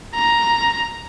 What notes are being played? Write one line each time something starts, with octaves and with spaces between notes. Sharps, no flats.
A#5